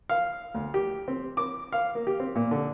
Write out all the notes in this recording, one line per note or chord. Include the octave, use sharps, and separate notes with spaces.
F5
D2
G4
C4
D6
F5
A#3
G4
C4
A#2
D3